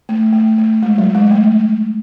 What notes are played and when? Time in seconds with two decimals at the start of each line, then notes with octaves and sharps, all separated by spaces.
0.09 A3
0.33 A3
0.58 A3
0.83 G#3
0.98 F#3
1.15 G#3
1.31 A3